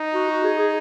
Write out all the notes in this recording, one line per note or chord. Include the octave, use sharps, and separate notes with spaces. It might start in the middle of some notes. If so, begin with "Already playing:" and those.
Already playing: D#4
F#4
F#4
G#4
G#4